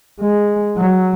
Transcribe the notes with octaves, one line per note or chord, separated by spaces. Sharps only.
G#3
F#3